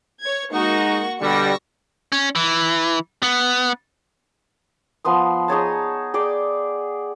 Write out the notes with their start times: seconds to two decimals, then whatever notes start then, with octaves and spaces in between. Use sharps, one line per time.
0.22 C#5 G#6
0.52 G#3 A#3 D#4 F#4 C#6
1.21 B2 D3 G3 C#6 E6 A#6
2.12 C#4
2.35 E3
3.23 B3
5.05 F3 B3 C6 D#6
5.48 D#4 G#4 C#5 A5
6.14 G#4 D5 G5 D6